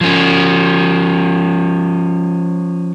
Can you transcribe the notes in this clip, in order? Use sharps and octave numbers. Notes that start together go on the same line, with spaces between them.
F3 C#4